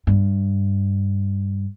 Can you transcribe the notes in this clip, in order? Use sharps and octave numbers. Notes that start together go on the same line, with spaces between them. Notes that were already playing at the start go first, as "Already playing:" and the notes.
G2